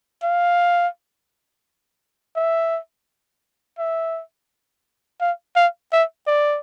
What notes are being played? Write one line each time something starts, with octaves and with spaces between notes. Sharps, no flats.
F5
E5
E5
F5
F5
E5
D5